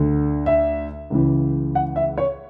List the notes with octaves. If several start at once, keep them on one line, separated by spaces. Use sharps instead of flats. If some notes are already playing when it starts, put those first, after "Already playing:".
Already playing: D2 D3
E5
C#2 C#3 E3
F#5
E5
C#5